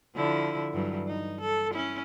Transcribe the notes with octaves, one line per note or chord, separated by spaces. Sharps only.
D3 F3 E4
G2 E3 F#3
D#4
A4
C#4 E4